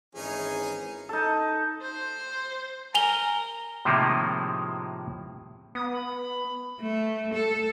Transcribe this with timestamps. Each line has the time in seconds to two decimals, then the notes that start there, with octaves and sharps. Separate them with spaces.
0.15 G#1 E3 C#4 D#4 G#4
1.09 D#4 A4
1.82 C5
2.94 A#4 G#5 F7 G7
3.85 A2 C3 D#3 F3 G#3 A#3
5.75 B3 D#6
5.92 B5
6.81 A3
7.34 A4